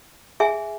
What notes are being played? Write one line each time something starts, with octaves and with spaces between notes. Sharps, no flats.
G#4 E5 G#5